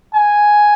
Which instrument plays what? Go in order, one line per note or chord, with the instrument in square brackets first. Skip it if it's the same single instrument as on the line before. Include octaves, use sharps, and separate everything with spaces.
[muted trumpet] G#5